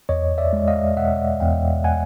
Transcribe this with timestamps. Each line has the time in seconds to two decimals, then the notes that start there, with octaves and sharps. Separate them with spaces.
0.09 E2 C#5 D#5
0.38 D5 E5
0.53 G#3
0.68 D#5 F5
0.97 B2 E5 F#5
1.40 E2 F5 G5
1.84 F#5 G#5